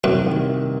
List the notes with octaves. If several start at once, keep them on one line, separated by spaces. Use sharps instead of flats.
C2 F#2
D#3